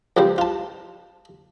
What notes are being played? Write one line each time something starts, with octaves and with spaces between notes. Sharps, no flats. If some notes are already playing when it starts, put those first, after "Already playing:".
C#2 F3 G3 C5
F4 A5